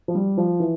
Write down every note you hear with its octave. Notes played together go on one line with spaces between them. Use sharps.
F3
G3
F3
E3